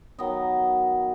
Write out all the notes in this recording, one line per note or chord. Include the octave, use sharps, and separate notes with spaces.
D#3 F#3 B3 D#5